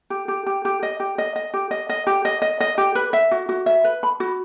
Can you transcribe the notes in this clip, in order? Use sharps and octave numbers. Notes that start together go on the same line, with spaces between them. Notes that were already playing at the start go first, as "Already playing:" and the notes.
G4
G4
G4
G4
D#5
G4
D#5
D#5
G4
D#5
D#5
G4
D#5
D#5
D#5
G4
B4
E5
F#4
F#4
E5
B4
B5
F#4